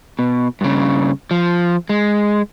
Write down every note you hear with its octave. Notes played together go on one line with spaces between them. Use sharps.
B2
G2 C#3
F3
G#3